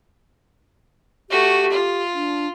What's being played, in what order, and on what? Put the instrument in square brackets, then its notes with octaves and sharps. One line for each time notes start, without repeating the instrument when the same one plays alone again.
[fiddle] A3 F#4 [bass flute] G4
[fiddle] F4
[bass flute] D4